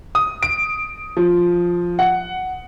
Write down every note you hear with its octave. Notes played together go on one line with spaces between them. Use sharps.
D#6
D7
F3
F#5